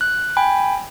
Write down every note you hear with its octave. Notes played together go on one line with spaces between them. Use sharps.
F#6
G5 G#5 B5